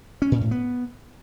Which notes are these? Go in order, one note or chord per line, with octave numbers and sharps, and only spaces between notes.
C#4
A#2
A2
B3